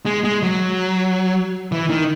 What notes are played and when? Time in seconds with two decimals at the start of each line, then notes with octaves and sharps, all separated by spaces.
0.05 G#3
0.24 G#3
0.43 F#3
1.72 E3
1.90 D#3